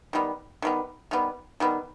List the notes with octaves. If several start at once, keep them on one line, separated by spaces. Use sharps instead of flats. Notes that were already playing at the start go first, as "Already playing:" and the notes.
D#3 G3 B3
D#3 G3 B3
D#3 G3 B3
D#3 G3 B3